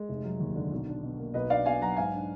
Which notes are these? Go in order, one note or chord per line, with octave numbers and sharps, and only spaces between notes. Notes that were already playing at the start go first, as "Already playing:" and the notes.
Already playing: G#3
F1
F#3
D#2
D3
B1
D4
B2
A#3
B1 B4 D#5
D4 D5 F5
B2 F5 G#5
F#3 F#5 A#5
G#2 F5 G#5
D4